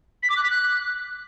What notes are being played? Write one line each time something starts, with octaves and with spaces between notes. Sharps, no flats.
B6
D6
F#6
B6
F#6